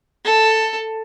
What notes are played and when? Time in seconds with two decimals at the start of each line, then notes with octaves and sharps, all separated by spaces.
0.25 A4